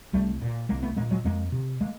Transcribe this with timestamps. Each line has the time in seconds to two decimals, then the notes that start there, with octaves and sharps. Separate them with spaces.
0.13 C2 G3 A3
0.42 A#2
0.69 C2 G#3 A#3
0.83 A3 B3
0.97 A#2 G#3 A#3
1.11 F#3 G#3
1.24 F2 G#3 A#3
1.52 C3
1.81 G#3 A#3